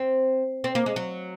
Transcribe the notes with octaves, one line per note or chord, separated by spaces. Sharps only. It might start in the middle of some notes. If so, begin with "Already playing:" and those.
Already playing: C4
C4
A#3
G#3
F#3